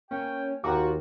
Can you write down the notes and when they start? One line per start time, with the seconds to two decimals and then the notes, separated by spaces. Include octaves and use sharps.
0.11 A#3 C#4 G5
0.64 D#2 F4 F#4 G5 A#5 D6